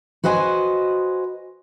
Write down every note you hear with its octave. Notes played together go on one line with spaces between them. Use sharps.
F#4 B4 C5 D#5 G5 G#5